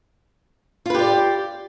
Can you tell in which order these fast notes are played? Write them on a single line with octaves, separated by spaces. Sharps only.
F4 B4 G4 D5